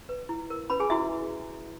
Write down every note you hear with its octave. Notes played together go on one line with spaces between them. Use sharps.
B4
E4
A#4
C#4 B4 B5
G#4 G#5
E4 F#4 E5